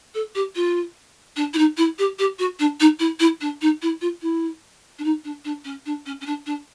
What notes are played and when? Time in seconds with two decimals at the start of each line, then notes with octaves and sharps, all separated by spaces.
0.15 A4
0.35 G4
0.56 F4
1.36 D4
1.54 E4
1.58 D#4
1.77 E4
1.99 G4
2.19 G4
2.39 F#4
2.59 D4
2.80 D#4
2.99 E4
3.20 E4
3.41 D4
3.61 D#4
3.82 E4
4.01 F4
4.22 E4
4.99 D4
5.04 D#4
5.24 D4
5.45 D4
5.65 C#4
5.86 D4
6.06 C#4
6.21 C#4
6.26 D4
6.46 D4